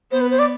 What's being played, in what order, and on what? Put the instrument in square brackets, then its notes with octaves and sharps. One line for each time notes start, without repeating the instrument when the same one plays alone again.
[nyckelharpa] B3 [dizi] C5
[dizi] B4
C5
D5